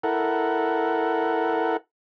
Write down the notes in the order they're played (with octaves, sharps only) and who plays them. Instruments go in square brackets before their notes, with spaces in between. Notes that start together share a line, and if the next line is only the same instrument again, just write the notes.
[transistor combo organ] E4 A4 A#4 F#5